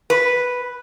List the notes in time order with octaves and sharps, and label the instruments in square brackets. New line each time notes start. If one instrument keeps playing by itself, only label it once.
[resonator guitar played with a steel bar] B4